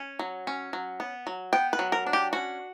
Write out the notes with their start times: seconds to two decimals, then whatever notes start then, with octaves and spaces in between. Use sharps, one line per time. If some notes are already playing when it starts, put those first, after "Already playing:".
Already playing: C#4
0.19 F#3
0.47 C#4
0.73 F#3
1.00 B3
1.27 F#3
1.53 B3 G5
1.73 B4
1.79 F#3
1.92 A#4
2.07 D4
2.13 G4
2.33 C#4 F#4